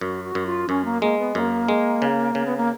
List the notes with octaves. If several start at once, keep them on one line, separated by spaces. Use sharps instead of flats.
F#2 F#4
F#4
F#2
F4
F#2 C#4
A#3
G#3 A#3
B3
F#2 A#3
G#3
C#3
C#3
B3
A#3